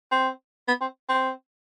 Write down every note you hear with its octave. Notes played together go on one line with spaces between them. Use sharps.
C4
B3
C4
C4